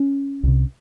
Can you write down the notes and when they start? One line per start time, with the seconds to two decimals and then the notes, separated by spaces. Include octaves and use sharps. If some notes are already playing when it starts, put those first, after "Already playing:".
Already playing: C#4
0.43 C2 C3